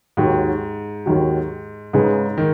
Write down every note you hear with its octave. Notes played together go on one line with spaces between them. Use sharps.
D#2 G#2 D#3 F#3
D#2 D#3 F#3
G#2 C#3 G#3 D#4 G#4 B4
D#3